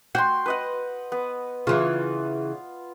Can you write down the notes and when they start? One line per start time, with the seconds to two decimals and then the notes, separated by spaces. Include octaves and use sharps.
0.15 F#4 G5 C6
0.46 B4 D#5 F#5
1.12 B3
1.67 C#3 E3 F4